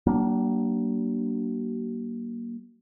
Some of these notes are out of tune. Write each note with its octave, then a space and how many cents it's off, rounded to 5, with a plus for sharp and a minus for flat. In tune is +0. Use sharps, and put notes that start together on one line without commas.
F#3 +45 A#3 +10 D4 -5